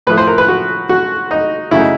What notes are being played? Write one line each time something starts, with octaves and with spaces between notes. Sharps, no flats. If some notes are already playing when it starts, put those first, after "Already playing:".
A2 F3 A3 B4
C5
A#4
B4
F#4
F#4
D#4
C#3 F#3 A3 E4
D#4